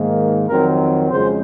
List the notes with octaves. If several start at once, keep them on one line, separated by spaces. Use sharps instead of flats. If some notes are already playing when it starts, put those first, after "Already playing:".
Already playing: G#2 D#3 A#3
F2 D#3 F#3 C4 A#4
F2 C#3 F3 G#3 C5